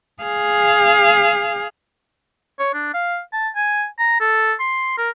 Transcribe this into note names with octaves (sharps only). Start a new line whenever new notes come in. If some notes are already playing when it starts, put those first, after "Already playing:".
G#4 F5
C#5
D4
F5
A5
G#5
A#5
A4
C6
A#4